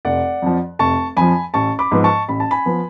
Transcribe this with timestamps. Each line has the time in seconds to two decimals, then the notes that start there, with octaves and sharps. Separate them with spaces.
0.05 F1 D5 F#5
0.42 F2 F3
0.79 F1 A5 C#6
1.17 F2 F3 G#5 B5
1.54 A1 A5 C#6
1.79 B5 D6
1.92 G#2 F3 B3
2.04 A5 C#6
2.28 A1 B5
2.40 A5
2.51 G#5 B5
2.66 F3 B3